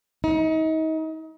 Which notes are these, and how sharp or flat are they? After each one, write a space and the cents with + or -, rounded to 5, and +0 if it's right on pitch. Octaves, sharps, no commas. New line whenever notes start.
D#4 +35